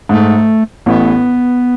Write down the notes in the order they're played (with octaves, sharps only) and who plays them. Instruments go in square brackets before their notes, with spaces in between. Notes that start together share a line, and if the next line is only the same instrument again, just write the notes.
[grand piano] G#2 [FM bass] A3
[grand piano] A1 A2 [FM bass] B3